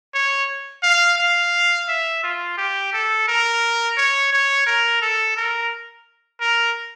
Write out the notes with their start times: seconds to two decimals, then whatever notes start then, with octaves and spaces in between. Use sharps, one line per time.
0.14 C#5
0.83 F5
1.18 F5
1.88 E5
2.23 F4
2.58 G4
2.93 A4
3.28 A#4
3.97 C#5
4.32 C#5
4.66 A#4
5.02 A4
5.37 A#4
6.41 A#4